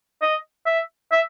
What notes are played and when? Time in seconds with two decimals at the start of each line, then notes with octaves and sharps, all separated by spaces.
0.22 D#5
0.66 E5
1.12 E5